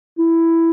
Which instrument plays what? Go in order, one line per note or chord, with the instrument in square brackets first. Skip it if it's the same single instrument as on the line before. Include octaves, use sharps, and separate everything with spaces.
[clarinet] E4